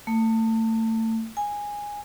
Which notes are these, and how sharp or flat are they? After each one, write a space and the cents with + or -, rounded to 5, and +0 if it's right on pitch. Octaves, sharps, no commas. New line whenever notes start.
A3 +30
G#5 -10